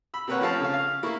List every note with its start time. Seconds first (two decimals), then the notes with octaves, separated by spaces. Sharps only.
0.14 B5 E6
0.27 C3 A#3 B4 C#5 F#5
0.40 F3 A3 C4 C#4 F5 A5
0.60 C#3 F5
0.74 F5
1.03 A3 A#3 E4 C#6